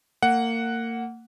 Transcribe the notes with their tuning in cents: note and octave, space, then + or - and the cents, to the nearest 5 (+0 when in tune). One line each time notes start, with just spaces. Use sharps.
A#3 -30 F#5 +0